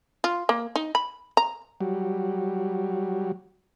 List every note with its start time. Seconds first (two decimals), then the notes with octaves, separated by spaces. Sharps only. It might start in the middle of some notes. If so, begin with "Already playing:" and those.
0.24 F4
0.49 A#3
0.76 D#4
0.95 B5
1.37 A#5
1.81 F#3 G3